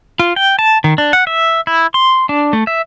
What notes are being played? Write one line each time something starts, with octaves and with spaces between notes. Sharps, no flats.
F4
G5
A5
D#3
D4
F#5
E5
E4
C6
D4
A3
E5